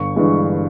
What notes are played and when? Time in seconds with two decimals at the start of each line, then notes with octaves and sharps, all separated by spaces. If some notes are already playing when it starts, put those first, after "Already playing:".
Already playing: G1 C#6
0.16 G2 E3 G#3